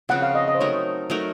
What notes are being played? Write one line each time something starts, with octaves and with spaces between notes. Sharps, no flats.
C#3 F3 C4 F#5
F5
D#5
D#5
C5
F#3 A3 D#4 A#4 C#5
F#3 A3 D#4 A#4